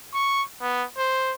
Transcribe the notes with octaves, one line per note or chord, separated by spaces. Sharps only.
C#6
B3
C5